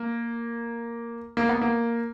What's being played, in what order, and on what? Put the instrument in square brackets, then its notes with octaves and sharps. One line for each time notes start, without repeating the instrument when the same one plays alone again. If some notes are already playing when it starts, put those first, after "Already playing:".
Already playing: [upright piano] A#3
A#3
B3
A#3